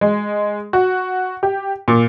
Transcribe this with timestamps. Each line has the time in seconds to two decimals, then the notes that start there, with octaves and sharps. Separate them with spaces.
0.01 G#3
0.73 F#4
1.43 G4
1.88 A#2